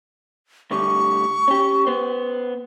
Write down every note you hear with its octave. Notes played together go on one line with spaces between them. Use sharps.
A2 D3 G3 C#6
C#4 G4
B3 C5